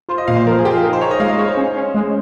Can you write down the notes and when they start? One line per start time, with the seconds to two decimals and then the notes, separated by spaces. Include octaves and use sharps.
0.09 F4 C5
0.18 D#5
0.28 A#2 F5
0.37 C5
0.46 F3 A#4
0.59 G#4
0.64 F4 G4
0.71 G#4
0.83 D#4 A#4
0.93 C5
1.01 D#4 C#5
1.11 D#5
1.20 G#3 F5
1.29 D#5
1.38 G#3 C#5
1.48 C5
1.57 C#4
1.76 C#4
1.95 G#3